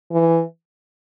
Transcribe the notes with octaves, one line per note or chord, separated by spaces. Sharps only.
E3